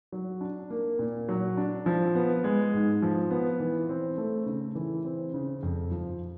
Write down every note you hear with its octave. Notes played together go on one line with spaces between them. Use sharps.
F#3
D4
A#3
A#2
F#3
D4
F3
B3
G#3
G#2
F3
B3
E3
C4
A3
C#3
E3
C4
C#3
F2
F3